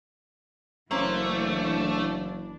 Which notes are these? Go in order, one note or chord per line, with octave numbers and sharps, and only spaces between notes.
F#1 E3 A3 A#3 C#4 D4 C5